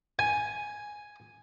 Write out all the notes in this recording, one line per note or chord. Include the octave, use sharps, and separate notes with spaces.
G#5